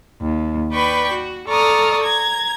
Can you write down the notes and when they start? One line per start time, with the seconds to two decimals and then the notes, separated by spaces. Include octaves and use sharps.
0.22 D#2
0.73 B4 D5 G5 B5 C#6
1.12 F#4
1.48 A4 D5 A#5 C#6 D#6 F6
2.02 A#5 G#6